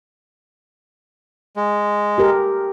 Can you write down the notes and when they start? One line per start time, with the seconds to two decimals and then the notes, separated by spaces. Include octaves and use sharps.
1.56 G#3
2.18 G4 A4 A#4